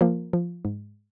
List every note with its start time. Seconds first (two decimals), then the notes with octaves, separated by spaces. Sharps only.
0.01 F3 A#3
0.33 F3
0.65 G#2